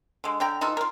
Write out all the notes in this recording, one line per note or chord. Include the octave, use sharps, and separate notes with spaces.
D3 G#3
D3 G5 A#5
E3 D#4 F4 A4
F4 A#4